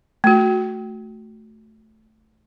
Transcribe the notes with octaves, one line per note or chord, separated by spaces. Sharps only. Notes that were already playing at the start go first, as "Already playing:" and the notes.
A3 F#4